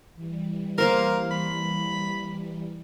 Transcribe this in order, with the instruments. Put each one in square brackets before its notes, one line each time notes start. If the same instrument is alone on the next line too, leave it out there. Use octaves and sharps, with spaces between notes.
[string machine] E3 G3
[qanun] A#3 C5 F5 [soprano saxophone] A#4
[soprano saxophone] B5